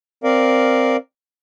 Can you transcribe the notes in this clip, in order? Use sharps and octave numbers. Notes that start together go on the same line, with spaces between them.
C4 A#4 D5 F5